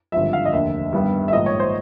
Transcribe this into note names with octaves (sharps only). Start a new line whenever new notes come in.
G#1 G2 D3 F3 E5
F5
D#5
F1 D#2 D3 E5
G2 D#3 G3 B3
E5
A#1 G#2 D#3 D#5
C#5
C5